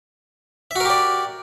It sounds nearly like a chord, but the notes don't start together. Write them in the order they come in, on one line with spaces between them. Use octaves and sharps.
E5 F#4 A#4 G4 D5